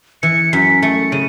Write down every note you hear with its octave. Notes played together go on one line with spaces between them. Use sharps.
E3 C#7
F#2 B6
A3 C#7
C#3 D#7